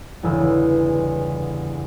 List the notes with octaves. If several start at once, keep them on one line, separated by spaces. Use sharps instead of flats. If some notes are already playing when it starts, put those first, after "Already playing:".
G1 E2 C#3 E6